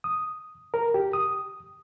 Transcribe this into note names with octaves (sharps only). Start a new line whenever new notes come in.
D#6
A#4
G4
D#6